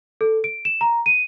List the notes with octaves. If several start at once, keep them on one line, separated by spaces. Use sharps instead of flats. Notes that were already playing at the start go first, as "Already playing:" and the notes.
A4
D7
E7
A#5
D#7